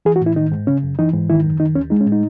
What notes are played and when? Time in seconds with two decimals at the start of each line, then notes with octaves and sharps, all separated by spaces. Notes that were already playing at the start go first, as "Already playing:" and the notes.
0.05 E3 G#4
0.16 F#4
0.21 A2
0.26 E4
0.36 D#3 D#4
0.52 G#2
0.67 C#3 C#4
0.83 F#2
0.99 E3 D#4
1.14 G#2
1.30 D#3 E4
1.44 F#2
1.60 D#3 D#4
1.75 D#2 C#4
1.90 G#3 D#4
2.01 C#4
2.06 A2
2.12 D#4